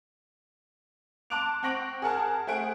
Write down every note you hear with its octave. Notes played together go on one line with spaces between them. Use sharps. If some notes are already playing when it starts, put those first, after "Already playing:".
A5 C6 D6 F#6 D7 F7
C4 F#5 C#6 A#6 D7 F#7
G#4 A#4 F#5 A5
A3 G#4 C5 F#5 D7